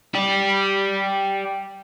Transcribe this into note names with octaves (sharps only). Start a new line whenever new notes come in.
G4 D5